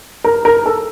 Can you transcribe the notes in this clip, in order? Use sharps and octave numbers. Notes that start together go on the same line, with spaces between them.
A#4
A#4
A4